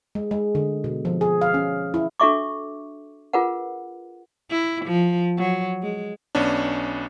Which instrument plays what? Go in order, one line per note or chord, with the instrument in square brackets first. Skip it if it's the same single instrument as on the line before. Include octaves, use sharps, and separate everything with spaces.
[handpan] G#3
G#3
D3
B2
F3
G#4
F5
C#4
E4
[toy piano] D4 F#4 A4 E5 C#6 D6
F4 G#4 A#4 B4 F#5
[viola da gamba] E4
F3
F#3
G#3
[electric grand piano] B1 B3 C#4 D4